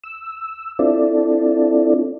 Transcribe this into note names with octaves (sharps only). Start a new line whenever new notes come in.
E6
C4 D4 E4 F4 A4 D5